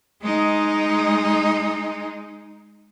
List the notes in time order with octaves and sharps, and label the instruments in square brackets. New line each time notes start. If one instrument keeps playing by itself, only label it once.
[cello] G#3 D#4